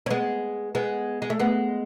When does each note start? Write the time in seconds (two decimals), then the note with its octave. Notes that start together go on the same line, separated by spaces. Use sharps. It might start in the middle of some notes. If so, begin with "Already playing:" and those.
0.06 C#4
0.10 G#3 B3
0.75 G#3 B3
1.22 G#3
1.30 A3
1.39 G#3 B3